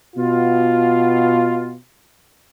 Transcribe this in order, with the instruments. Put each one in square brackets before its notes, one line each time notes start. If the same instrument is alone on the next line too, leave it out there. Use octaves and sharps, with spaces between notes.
[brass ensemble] B2 F4